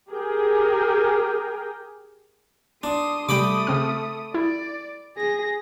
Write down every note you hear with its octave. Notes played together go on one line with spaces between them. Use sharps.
G4 G#4 A#4 G5
D4 C6 D#6
C3 G3 A3 G5 B5 D6 D#6
C#3 C4 F6
E4 D5
G#4 A#6